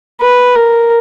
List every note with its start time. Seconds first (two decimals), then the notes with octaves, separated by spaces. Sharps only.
0.21 B4
0.55 A#4